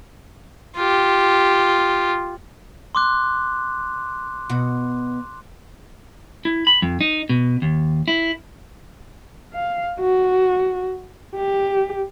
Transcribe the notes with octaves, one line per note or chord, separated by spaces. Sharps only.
F4 G4
C6 D6 F#6
B2 F#4
E4
B5
F2
D#4
B2
D#2
E4
F5
F#4
G4